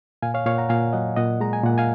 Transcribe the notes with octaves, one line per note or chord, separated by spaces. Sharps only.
A#2 F5 G#5
C#5 F5
A#2 C#5 F5
F#5 A#5
A#2 F5 G#5
F#3 D#5 F#5
A#2 D#5 F#5
G#3 A#5
G#5
A#2 F#5
F5 G#5